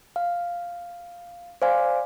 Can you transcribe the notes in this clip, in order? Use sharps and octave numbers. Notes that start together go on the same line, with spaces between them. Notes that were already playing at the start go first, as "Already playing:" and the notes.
F5
C5 D5 F5 G#5